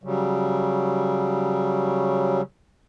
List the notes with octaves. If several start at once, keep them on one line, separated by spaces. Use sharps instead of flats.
C#3 F#3 G3